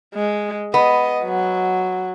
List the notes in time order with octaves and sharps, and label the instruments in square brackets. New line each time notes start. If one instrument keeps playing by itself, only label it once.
[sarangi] G#3
[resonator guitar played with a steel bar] B3 [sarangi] D#5
[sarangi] F#3